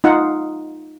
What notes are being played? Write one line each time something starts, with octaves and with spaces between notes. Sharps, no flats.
D#4 F4 F#5